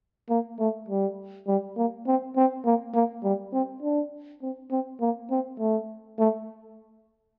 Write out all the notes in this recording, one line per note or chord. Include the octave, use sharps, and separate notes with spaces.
A#3
A3
G3
G3
A#3
C4
C4
A#3
A#3
G3
C4
D4
C4
C4
A#3
C4
A3
A3